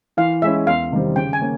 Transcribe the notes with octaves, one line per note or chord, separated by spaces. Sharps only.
E3 F5
G#3 C#4 E4 E5
E2 F5
C3 D#3 G3 C4
C#3 G5
G#5
A#3 C#4